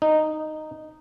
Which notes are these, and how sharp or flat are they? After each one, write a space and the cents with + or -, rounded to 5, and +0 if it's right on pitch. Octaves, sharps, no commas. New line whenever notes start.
D#4 -10